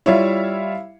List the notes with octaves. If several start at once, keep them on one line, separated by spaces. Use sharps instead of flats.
G3 E4 F4 C#5 E5 F5